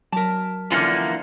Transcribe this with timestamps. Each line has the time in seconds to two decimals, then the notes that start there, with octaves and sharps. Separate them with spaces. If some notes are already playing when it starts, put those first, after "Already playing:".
0.12 F#3 A#4 A5 B6
0.72 D3 E3 F3 A#3 C#4 F4 F#5 F6